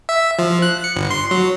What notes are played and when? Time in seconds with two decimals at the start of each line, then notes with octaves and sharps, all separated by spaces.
0.09 E5
0.39 F3
0.62 F#6
0.84 C#7
0.96 G1
1.11 C6
1.31 F#3